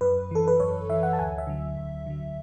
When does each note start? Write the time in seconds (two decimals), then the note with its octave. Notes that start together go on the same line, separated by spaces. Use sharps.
0.01 F#2 B4
0.31 E3 A4
0.48 B4
0.60 F#2 C#5
0.90 E3 E5
1.03 F#5
1.13 A5
1.19 D2 G#5
1.38 E5
1.47 D3 F#3
1.77 D2
2.07 D3 F#3